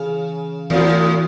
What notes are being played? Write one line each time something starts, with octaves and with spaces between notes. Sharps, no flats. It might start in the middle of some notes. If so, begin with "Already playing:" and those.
Already playing: C#3 E3
A2 E3 C4 F#4